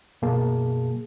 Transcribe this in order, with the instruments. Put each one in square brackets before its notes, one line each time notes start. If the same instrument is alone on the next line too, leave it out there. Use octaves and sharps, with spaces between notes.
[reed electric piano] F#2 B2 F#3 A#3 G#4 A5